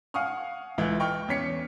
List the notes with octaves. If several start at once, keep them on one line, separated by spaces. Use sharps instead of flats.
F5 F#5 G#5 C#6 D#6 F6
C#2 E3
D#5 G5 C#6 F6
E2 C#4 B6 C#7